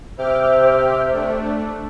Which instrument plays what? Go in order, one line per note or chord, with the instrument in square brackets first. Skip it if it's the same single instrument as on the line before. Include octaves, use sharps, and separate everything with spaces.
[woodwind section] C3 E5 [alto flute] C5 [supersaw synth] G5 D6 F6
[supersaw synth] A3 D4